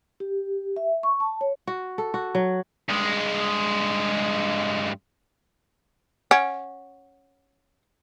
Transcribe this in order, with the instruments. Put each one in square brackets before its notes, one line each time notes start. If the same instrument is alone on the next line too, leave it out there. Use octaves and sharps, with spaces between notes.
[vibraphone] G4
E5
C#6
A5
C#5
[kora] F#4
A4
F#4
F#3
[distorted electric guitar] G2 G#3
[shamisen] C#4 [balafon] F#5